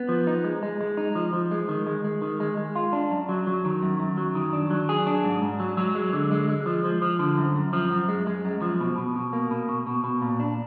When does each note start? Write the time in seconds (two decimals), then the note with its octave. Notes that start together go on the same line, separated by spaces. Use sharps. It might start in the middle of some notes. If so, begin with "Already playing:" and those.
Already playing: B3
0.09 F3
0.27 D#4
0.44 G#3
0.63 G#3
0.81 G#3
0.97 D#4
1.15 F3
1.33 F3
1.51 G#3
1.69 D#3
1.87 G#3
2.04 G#3
2.22 D#3
2.40 G#3
2.57 G#3
2.75 F4
2.93 D4
3.10 F#2
3.29 F#3
3.47 F#3
3.65 D#3
3.83 F#2
4.00 F#2
4.18 F#3
4.35 D#3
4.53 D4
4.70 F#3
4.89 G#4
5.07 D4
5.24 G#2
5.42 G#2
5.60 F#3
5.77 F#3
5.95 G#3
6.13 D3
6.32 G#3
6.49 G#3
6.66 F3
6.85 F3
7.02 F3
7.19 D3
7.38 F#2
7.56 F#2
7.73 F3
7.91 F#2
8.08 G#3
8.27 G#3
8.45 F#2
8.62 F3
8.80 B2
8.98 B2
9.16 B2
9.33 A#3
9.51 B2
9.69 B2
9.87 B2
10.04 B2
10.22 A#2
10.40 D4